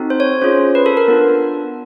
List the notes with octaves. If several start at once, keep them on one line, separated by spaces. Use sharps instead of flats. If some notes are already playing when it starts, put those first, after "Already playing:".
Already playing: C4 D#4 F#4 A4
C5
C#5
C#4 F4 G#4 C5
B4
A4
A#4
B3 D4 F4